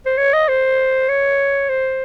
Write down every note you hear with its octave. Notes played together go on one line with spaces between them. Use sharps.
C5
C#5
D#5
C5
C#5
C5